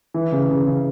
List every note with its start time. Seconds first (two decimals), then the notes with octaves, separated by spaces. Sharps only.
0.14 E3
0.32 C#3
0.50 C#3
0.67 C#3